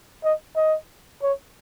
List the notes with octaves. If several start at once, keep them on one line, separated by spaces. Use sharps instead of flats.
D#5
D#5
C#5